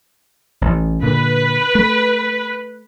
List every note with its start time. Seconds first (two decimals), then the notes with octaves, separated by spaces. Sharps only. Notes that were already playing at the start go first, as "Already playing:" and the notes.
0.61 A1
1.02 A#2 D3 B4
1.75 A3